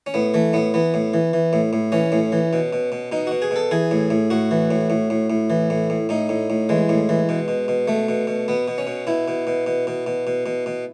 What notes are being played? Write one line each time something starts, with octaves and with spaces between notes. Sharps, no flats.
C#4
A2 B3
E3 A3
A2 B3
E3 B3
A2
E3
E3
A2
A2
E3 C#4
A2
E3
B2
B2
B2
B2 D#4
B2 F#4
G#4
B2 A4
E3 G#4
A2
A2
A2 F#4
E3
A2
A2
A2
A2
E3
A2
A2
A2 D#4
A2
A2
E3 G#3
A2
E3
B2
B2
B2
B2 A3
B2
B2
B2 B3
B2
C#4
B2
B2 E4
B2
B2
B2
B2
B2
B2
B2
B2